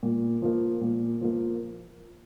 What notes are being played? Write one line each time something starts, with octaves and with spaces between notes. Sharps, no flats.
A#2
F3 A#3
A#2
F3 A#3